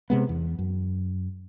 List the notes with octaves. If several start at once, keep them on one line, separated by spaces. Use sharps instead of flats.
C3 G#3 B3
E2
F#2